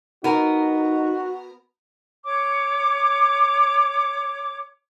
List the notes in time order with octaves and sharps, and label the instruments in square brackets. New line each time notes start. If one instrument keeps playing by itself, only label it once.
[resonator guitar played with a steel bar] B3 A#4 [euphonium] D#4 [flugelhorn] F#4
[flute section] C#5 D6